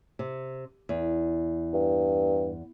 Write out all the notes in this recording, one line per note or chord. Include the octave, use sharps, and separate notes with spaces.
C3
E2
G2